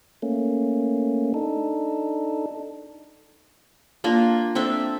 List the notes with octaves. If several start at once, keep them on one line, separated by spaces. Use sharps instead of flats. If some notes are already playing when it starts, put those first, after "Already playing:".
A3 A#3 C#4
D4 D#4 A4
A#3 D4 F4
C4 D4 A4 E5